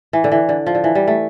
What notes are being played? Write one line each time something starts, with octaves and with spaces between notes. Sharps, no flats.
E3
D3
E3
D3
F3
D3
E3
G3
A3